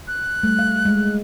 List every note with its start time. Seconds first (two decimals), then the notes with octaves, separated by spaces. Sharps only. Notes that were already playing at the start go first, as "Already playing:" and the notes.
0.08 F#6
0.43 G3 A3
0.59 F5
0.85 G#3